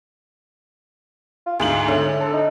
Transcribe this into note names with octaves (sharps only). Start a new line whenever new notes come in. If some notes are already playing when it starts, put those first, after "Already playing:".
F4
D2 G#2 G#4 F#7
A2 D3
A4
D#4